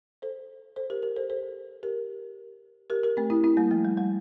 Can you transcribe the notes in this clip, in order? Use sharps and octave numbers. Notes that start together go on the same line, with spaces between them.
A4 C5
A4 C5
G4 A#4
G4 A#4
A4 C5
A4 C5
G4 A#4
G4 A#4
G4 A#4
A3 C4
C4 E4
C4 E4
G3 A#3
F3 A3
G3
G3